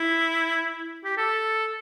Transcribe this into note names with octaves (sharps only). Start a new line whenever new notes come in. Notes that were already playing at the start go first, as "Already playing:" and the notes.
Already playing: E4
G4
A4